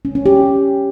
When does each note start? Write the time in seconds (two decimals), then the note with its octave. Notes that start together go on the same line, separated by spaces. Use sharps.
0.05 C#4
0.15 C#4
0.26 G4